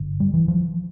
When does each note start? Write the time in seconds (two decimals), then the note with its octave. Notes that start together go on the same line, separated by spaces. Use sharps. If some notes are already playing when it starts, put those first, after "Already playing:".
Already playing: G1 D3
0.20 G3
0.34 E3
0.48 F3